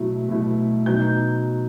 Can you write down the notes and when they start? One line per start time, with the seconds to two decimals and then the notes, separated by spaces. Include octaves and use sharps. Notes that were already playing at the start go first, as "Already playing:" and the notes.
Already playing: B2 F#3 A3 E4
0.29 B2 F#3 A3 E4
0.86 B2 F#3 B3 D#4 G6